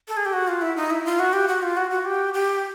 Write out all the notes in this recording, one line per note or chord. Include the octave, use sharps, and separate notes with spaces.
A4
G#4
G4
F#4
F4
E4
D#4
E4
F4
F#4
G4
F#4
F4
F#4
F#4
G4
G4